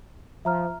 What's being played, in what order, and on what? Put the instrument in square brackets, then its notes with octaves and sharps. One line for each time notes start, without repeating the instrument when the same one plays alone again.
[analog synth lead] F3 [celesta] E5 A#5 F6